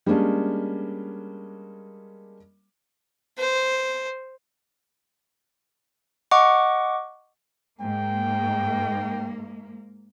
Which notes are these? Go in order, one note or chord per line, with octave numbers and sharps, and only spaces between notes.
G3 G#3 A#3 C#4 D4
C5
D#5 F#5 C#6 D6
G#2 A#3 G5